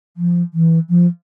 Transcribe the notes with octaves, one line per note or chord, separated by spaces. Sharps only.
F3
E3
F3